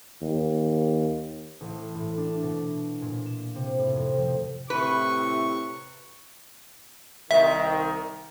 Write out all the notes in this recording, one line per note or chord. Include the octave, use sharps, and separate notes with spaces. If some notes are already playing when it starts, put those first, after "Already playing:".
D#2
A1
A2
D4
B2
A#2
E7
C3
A2
F2
F3
A2 C3 E4 B4 C#6
C2 D#3 E5